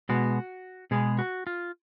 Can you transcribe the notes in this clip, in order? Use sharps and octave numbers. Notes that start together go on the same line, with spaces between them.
B2 G#3 B3 F#4
B2 G#3 B3 G#4
F#4
F4